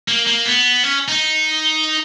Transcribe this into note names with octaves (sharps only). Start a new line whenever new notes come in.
A#3
A#3
B3
C#4
D#4